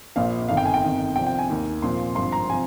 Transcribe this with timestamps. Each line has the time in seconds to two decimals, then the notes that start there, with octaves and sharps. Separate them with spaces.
0.16 A#1 A#2 F3 F5
0.49 G1 F2 D#3 F5
0.57 G5
0.66 G#5
0.74 G5
0.82 G1 F2 D#3
1.16 C2 C3 F3 G5
1.27 G5
1.39 G#5
1.50 D#2 D#3
1.82 C2 A#2 F3 C6
2.15 G#1 G2 F3 C6
2.32 A#5
2.50 C3 F3 G#5